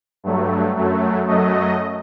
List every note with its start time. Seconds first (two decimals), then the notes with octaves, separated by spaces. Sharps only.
0.24 G2 F#3 A3
0.75 F#2 F#3 A3
1.27 F#2 F#3 A3 D#5